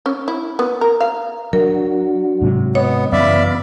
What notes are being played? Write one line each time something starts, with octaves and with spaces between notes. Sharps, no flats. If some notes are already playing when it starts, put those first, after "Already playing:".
C#4
E4
B3
A#4
F5
F#3 D4 F#4 A#4
G#2 C3 F#3
B3 C#5 D#5
F#2 C#3 E3 B3 D5 E5 F5 B5